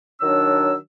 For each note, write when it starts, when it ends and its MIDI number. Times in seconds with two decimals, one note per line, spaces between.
0.21 0.75 51
0.21 0.75 54
0.21 0.75 62
0.21 0.75 73
0.21 0.75 88